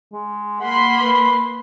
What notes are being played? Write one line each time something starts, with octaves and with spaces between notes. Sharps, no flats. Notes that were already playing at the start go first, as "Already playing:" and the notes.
G#3
A#3 F#5 B5 C6
B4